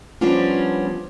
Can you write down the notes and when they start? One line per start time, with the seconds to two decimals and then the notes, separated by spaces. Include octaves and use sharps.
0.21 F3 G3 B3 C#4 D4 F4